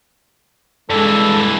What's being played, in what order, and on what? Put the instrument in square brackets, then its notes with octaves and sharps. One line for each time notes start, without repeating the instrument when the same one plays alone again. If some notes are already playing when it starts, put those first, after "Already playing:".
[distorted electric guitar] G2 E3 [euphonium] G#3 [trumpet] A4